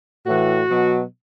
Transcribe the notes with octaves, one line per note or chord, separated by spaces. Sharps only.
A2 E3 F#4
B2 F#3